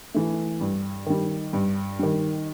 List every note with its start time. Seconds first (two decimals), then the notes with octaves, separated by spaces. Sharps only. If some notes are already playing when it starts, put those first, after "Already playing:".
0.14 E3 A3
0.61 G2
1.06 D#3 G3
1.53 G2
1.99 D#3 G3